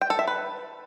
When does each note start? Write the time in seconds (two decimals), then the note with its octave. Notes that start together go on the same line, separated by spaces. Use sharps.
0.01 G5
0.10 A4
0.19 E5
0.27 B4